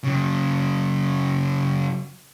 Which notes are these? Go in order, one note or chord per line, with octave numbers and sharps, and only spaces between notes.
C#3 F#3